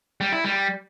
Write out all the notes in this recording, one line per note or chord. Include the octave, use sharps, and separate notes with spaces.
G3
E4
G3